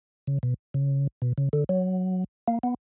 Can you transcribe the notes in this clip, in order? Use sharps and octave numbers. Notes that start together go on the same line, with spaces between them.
C#3
B2
C#3
B2
C#3
D3
F#3
A#3
B3